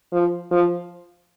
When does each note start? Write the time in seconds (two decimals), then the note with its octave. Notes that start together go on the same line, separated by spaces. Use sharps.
0.13 F3
0.51 F3